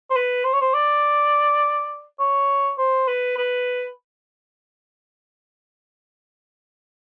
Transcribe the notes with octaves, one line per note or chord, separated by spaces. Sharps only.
C5
B4
C5
C#5
C5
D5
C#5
C5
B4
B4